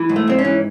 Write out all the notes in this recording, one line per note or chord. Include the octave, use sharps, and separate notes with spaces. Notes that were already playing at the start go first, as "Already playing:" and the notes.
Already playing: E3
G#2
A3
G#2 C4
C#4
E3